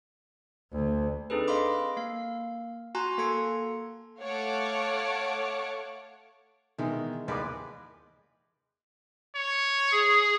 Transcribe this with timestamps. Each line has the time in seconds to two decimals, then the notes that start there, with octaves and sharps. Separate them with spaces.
0.72 D2
1.30 C4 D4 D#4 G#4 A4 B4
1.48 D#5 F5 B5 C6 D6
1.97 A#3 F5
2.95 F#4 G#5 A#5 C6 F#6
3.18 A#3 A4 C6 G#6 C#7
4.19 A3 C#5 F5 F#5 A5 D6
6.78 B2 D#3 E3 G#3
7.28 D#2 G#3 B4 D5 B5 D6
9.35 C#5
9.92 G#4